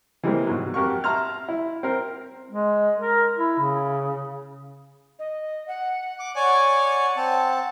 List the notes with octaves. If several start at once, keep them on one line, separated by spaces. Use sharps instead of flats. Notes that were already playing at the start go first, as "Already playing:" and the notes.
E3 G3 G#3 A#3 C4
G#2 B2 F#3
F2 G4 A#4 F#5 C#6
E5 A5 A#5 C6 F6
E4
C4 A#4
G#3
A#4
E4
C#3
D#5
F#5
D6
C#5 D5 G#5
C4 A5